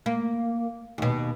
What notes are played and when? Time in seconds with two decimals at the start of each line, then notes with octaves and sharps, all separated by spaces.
0.06 A#3
0.98 D#2 B2